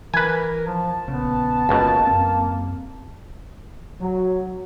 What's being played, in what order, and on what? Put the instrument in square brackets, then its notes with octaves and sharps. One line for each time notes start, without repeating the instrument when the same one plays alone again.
[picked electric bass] E3 [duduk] A#4 [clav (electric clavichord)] B4 G#5
[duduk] F3 [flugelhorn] A5
[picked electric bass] A#1 C#3 [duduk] B3
[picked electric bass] G1 [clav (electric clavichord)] C#2 B2 [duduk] A#3
[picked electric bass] F#2 C4
[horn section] F#3